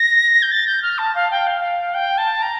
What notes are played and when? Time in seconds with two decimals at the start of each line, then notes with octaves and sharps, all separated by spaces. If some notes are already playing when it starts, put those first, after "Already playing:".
Already playing: A#6
0.42 G6
0.51 A6
0.67 G6
0.82 F6
0.98 A5
1.15 F5
1.31 G5
1.47 F5
1.94 G5
2.18 A5
2.42 A#5